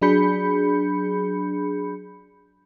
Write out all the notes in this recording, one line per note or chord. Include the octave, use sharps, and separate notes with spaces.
F#3 D4 G#4 B5 G6 C#7